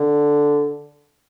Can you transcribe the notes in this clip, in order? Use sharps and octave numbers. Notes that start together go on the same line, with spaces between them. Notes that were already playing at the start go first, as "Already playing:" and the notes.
Already playing: D3